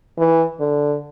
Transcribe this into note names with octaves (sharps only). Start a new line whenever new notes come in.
E3
D3